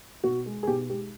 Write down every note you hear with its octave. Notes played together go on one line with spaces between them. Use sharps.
B2 F#4
G#3
G#4
B2 G4
G#3 G4